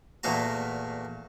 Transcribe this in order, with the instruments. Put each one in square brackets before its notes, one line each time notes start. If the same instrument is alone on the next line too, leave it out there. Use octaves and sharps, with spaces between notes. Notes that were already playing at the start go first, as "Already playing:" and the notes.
[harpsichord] E2 A#2 A3 A#3 F#4 A#5